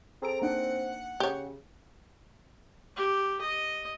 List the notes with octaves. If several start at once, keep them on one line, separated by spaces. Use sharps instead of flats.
C4 G#4 A4 A#5 D7
A#3 D4 D#4 F#5
C#3 G4 C#5
G4
D#5